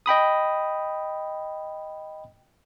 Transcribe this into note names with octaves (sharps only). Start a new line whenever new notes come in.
D#5 G5 B5 D#6